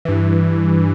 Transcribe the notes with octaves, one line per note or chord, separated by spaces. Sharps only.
G2 E3